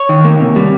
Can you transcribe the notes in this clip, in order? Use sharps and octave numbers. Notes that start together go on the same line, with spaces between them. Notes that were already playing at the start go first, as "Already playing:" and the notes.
Already playing: C#5
D#3
A#3
C3
G3